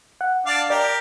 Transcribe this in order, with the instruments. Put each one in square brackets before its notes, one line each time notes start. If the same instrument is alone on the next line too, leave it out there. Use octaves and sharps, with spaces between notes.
[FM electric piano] F#5
[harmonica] D4 D5 F5
[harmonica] G4 A#4 [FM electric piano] D5